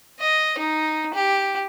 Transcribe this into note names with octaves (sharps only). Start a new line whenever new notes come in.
D#5
D#4
G4